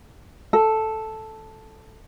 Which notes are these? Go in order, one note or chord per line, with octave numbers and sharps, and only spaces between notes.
A4